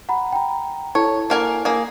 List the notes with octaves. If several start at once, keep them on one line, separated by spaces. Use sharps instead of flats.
F#5 A#5 B5
G5 A#5
E4 A4 C#5 A5
A#3 A#4 G#5
A#3 G#4